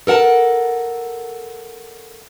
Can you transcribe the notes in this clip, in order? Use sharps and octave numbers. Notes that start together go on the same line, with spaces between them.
A4 A#4 F#5 A5